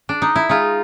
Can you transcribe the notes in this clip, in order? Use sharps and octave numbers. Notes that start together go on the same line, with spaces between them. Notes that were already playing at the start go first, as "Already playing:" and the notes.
D4
D#4
E4
G#3 D#4 F4